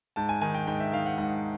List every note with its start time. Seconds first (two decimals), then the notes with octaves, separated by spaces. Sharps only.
0.16 G#2 A5
0.29 G#5
0.41 D#3 G#5
0.54 G5
0.67 G#2 G5
0.80 E5
0.93 D#3 F5
1.06 F#5
1.18 G#2 F#5